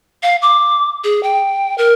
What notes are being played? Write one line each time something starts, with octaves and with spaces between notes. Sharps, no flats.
F5
D6
G#4
G5
A#4